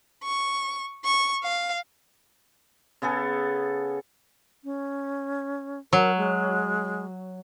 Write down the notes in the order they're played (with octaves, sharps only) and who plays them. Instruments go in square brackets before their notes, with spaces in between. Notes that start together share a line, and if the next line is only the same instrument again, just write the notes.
[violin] C#6
C#6
F5
[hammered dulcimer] C#3 B3 G#4 A4
[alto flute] C#4
[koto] F#3 [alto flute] A#4
[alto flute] G#3